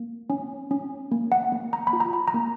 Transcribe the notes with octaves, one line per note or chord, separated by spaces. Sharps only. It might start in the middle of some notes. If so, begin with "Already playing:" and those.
Already playing: A#3
C#4
C#4
A#3
F#5
A#3
A#5
B5
F4
A#5
B5
A#5
A#3